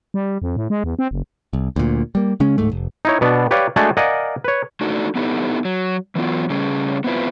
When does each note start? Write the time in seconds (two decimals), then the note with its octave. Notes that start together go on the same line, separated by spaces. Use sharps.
0.14 G3
0.42 F2
0.56 A2
0.70 G#3
0.84 E2
0.99 C4
1.11 F#1
1.53 C2
1.76 D2 A#2
2.15 G3 A#3
2.40 C#3 G#3 C#4
2.58 D1 G#2 A3
2.71 F1
3.05 D#4 E4 C#5
3.21 B2 B3 D4
3.51 G4 B4 C#5 D5 F5
3.76 G#3 A3 D4 F#4 G#4 A4
3.97 A#4 D5 D#5 F5 F#5 G#5
4.44 B4 C#5
4.81 A3 D4 D#4 F#4 A4
5.15 B3 D#4 E4 G4 A4
5.65 F#3
6.15 E3 F#3 B3 F4
6.50 C#3 G3 C#4 G#4
7.04 B3 C4 E4 F4 B4